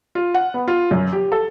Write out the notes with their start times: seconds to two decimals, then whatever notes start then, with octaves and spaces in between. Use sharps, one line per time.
0.15 F4
0.34 F#5
0.54 B3
0.67 F4
0.91 F#2
1.13 G4
1.32 A4